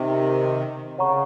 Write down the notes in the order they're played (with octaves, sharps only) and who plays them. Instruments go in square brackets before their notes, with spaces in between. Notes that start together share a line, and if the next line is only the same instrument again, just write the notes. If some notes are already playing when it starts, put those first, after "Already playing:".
Already playing: [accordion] C3 D#3
[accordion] C#3 [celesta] C#5 F#5 A#5 C#6